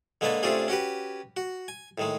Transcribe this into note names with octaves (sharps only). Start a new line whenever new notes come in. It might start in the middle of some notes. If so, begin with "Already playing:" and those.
D3 G#3 A#3 B4 C#5 A5
C3 A3 C#4 D4 F4 G#4
C#4 F#4 G4 B4
F#4
G#5
A2 D#3 G#3